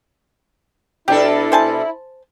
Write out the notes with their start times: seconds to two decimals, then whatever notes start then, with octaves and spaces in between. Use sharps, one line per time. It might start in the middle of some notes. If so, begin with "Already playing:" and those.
1.08 B2 D4 E4 G4 A4
1.52 C5 G#5 A5